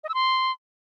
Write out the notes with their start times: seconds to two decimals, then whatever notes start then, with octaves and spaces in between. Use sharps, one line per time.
0.04 D#5
0.09 E6
0.14 C6